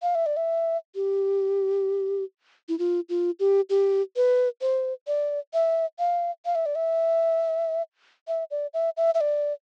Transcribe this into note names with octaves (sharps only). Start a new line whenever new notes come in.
F5
E5
D5
E5
G4
E4
F4
F4
G4
G4
B4
C5
D5
E5
F5
F5
E5
D5
E5
E5
D5
E5
E5
E5
D5